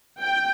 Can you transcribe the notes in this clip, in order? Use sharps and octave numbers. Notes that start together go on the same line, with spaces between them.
G5